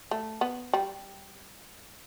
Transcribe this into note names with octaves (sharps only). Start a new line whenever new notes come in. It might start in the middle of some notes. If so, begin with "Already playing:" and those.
A3
B3
G3